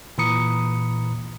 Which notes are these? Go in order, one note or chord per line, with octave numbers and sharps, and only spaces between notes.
A#2 E3 A#5 B5 D#6 C#7